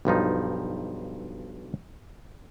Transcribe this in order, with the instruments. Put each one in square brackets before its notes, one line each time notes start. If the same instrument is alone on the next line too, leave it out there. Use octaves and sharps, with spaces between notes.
[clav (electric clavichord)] B1 G2 F3 D#4